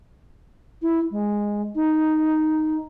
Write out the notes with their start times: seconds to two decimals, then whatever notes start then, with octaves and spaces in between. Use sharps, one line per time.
0.82 E4
1.11 G#3
1.75 D#4